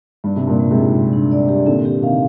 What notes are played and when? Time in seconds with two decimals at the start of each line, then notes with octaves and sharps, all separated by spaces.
0.24 G2 G3
0.36 C3
0.42 D4
0.47 G2 A#2
0.60 G3
0.71 G#2 C3
0.77 F4
0.95 G3
1.13 D4
1.31 D5
1.49 G4
1.66 A#2 D3 C4
1.85 G4
2.02 C3 D#3 F5